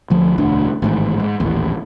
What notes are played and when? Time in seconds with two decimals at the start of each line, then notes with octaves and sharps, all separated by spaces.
0.10 D2 F3
0.38 E1 D2 A3 D4
0.82 A1 G#2 D#3
1.20 G#2
1.40 D#1 A1 D#2